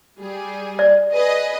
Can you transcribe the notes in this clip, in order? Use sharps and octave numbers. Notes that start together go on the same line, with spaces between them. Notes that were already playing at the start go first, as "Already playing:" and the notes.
G3 G#4
D5
G#4 B4 D#5